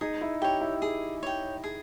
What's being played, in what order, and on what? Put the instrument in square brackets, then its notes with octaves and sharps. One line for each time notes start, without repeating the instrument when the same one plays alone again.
[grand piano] D#4 [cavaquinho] G#4
[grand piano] E4
[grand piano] G4 [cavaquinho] C#5 G5
[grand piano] E4
[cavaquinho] G#4
C#5 G5
G#4